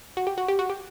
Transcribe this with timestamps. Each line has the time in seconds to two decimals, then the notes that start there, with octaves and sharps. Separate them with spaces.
0.17 F#4
0.27 G4
0.38 F#4
0.48 G4
0.59 F#4
0.70 G4